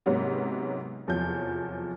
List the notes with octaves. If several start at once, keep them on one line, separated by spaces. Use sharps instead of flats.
G#2 C3 F#3 A#3 B3 C#4
F1 E2 F3 F#3 G6